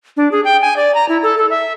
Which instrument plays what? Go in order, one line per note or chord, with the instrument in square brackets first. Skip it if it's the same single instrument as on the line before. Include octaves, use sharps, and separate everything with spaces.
[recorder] D4
G#4
G5
G#5
D5
A#5
E4
A4
A4
E5